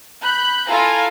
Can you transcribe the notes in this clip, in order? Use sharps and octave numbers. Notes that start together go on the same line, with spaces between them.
B5 F#6 G6
E4 F4 A4 F5 G#5 A#5